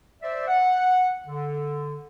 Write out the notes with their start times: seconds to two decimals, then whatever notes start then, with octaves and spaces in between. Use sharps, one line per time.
0.23 C5 D5 E5
0.48 F#5
1.27 D3